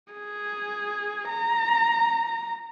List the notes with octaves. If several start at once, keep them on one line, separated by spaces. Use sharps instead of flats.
G#4
A#5